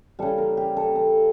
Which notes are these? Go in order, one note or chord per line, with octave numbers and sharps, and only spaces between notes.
C#3 G3 A4
A#4
G4
A4
A4